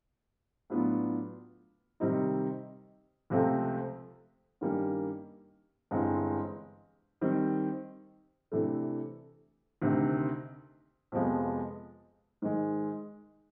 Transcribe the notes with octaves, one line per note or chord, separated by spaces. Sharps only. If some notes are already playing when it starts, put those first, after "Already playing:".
A2 F#3 B3 D4 F4
C3 D#3 G3 C4 D#4
C#2 C3 F3 A3 C4
G2 D#3 G3 A#3 C#4
G1 G2 E3 G#3 C4
D#3 G3 C4
C3 E3 A3 D4
D2 C3 D#3
F2 C3 F3 G#3 B3
G#2 D#3 G#3